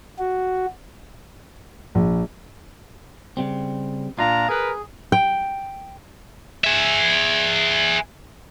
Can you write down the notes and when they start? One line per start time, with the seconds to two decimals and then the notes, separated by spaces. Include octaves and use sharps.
0.19 F#4
1.95 A#1
3.37 C#3 G3 C4
4.19 A#2 D4 F4 F5 A#5
4.49 G#4 A#4 B4
5.12 G5
6.64 G#4 E5